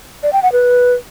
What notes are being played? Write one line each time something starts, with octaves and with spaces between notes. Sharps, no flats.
D5
G5
F#5
B4